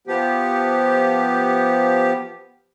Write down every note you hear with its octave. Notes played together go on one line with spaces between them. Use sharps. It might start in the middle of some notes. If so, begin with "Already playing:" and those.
F3 B3 G4